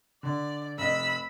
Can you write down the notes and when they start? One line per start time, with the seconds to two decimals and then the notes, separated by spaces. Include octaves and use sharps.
0.23 D3 D5
0.78 F1 D#5 B5 E6